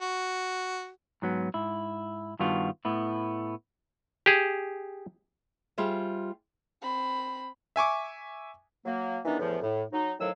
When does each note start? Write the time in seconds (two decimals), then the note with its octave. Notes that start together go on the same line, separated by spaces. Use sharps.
0.02 F#4
1.22 G#2 F#3 B3
1.54 G#2 E4
2.39 G2 D#3 G3 B3 F4 F#4
2.85 A2 B3 E4
4.26 G4 G#4
5.78 G3 F4 G#4 C5 E5
6.82 C4 B5
7.76 E5 G#5 C#6 D6
8.85 F#3 A#3
9.25 D#3 E3 G3 B3 D4 D#4
9.39 E2 A2 E3 F3
9.62 A2
9.92 F#3 D#4
10.19 F2 A2 D#3 F#3 F5 E6